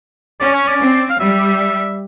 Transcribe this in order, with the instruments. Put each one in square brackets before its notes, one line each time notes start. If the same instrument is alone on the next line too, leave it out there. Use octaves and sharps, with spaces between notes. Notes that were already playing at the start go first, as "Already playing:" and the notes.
[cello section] C#4 [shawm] D5
[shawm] C#5
D5
[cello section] C4
[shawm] F5
[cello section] G3 [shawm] E5